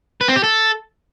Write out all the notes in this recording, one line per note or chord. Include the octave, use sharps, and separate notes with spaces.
B4
C4
G4
A4